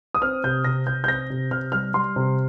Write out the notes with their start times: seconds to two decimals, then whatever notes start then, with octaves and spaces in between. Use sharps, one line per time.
0.14 D#6
0.22 C4 F6
0.44 C3 G6
0.64 C3 A#6
0.87 C3 G6
1.04 G6
1.08 C4 A#6
1.30 C3
1.51 C3 F6
1.72 G3 F6
1.94 G3 C6
2.16 C3